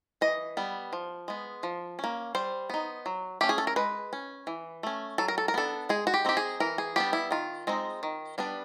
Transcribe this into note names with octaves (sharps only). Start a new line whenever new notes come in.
E3 D#5
G3 B3
F3
G#3 B3
F3
A#3 C#4
G3 C5
B3 D#4
F#3
A3 C#4 G4
G#4
A4
A#4
G#3 B4
C#4
E3
A3 C#4
F#3 A4
A#4
A4
A#4
B3 D4 A4
G#3 G#4
F#4
G4
C4 D#4 G4
G#4
E3 A#4
G#4
G3 B3 D4 G4
E4
D#3 F4
G#3 C4 D#4
D#3
G3 B3 D4